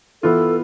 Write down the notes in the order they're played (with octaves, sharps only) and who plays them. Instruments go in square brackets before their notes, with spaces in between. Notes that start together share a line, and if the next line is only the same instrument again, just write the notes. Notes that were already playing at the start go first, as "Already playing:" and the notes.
[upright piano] E3 B3 F4 [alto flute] A4